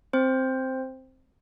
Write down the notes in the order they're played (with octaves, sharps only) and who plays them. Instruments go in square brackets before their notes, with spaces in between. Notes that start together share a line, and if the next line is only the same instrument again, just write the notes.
[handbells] C4 C5